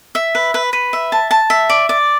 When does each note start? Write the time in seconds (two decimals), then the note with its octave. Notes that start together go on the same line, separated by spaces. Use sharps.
0.15 E5
0.35 B4
0.54 B4
0.73 B4
0.93 E5
1.12 A5
1.31 A5
1.50 E5
1.69 D5
1.89 D5